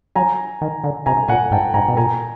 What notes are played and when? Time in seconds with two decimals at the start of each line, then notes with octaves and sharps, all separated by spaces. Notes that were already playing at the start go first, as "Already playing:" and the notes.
0.15 F#3 G#5 A#5
0.61 D#3
0.84 D3
1.06 C3 G#5 A#5
1.28 A#2 F#5 G#5
1.51 G#2 G5 A5
1.74 G#2 G#5 A#5
1.88 B2
1.97 A#2 G#5 A#5